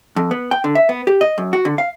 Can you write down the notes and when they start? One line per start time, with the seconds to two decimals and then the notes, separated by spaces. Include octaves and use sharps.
0.16 F2
0.31 B3
0.51 G5
0.64 D3
0.75 E5
0.89 B3
1.07 G4
1.21 D#5
1.38 F#2
1.53 F#4
1.65 D3
1.78 F5